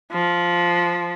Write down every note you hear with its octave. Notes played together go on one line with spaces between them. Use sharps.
F3